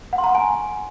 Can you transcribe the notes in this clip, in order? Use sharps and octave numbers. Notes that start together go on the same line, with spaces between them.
F#5
C6
A#5
C#6
G#5